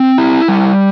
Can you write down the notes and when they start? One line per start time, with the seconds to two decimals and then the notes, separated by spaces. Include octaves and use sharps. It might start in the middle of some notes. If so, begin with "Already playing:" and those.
Already playing: C4
0.18 E4
0.48 G3